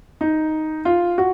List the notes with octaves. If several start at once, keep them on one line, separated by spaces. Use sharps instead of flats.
D#4
F4
F#4